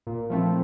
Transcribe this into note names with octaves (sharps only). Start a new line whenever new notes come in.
A#2
F3 A3 C4 E4